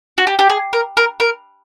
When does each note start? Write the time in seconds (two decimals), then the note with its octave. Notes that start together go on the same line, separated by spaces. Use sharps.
0.18 F#4
0.27 G4
0.39 G4
0.50 G#4
0.73 A#4
0.97 A#4
1.20 A#4